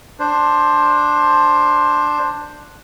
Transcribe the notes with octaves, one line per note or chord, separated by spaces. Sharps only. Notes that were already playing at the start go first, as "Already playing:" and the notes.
D4 C5